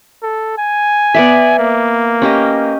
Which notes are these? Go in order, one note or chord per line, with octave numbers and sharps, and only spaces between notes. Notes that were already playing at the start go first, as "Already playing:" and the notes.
A4
G#5
B3 D5 E5
A#3
C#4 G4 D#5